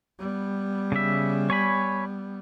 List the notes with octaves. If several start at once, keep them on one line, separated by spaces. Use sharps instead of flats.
G3 B3
C#3 E5
C#5 G#5 B5